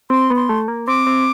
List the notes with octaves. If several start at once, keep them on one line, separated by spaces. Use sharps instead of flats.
C4 C6
B3
C6
A3
A#3
C4 D6
C4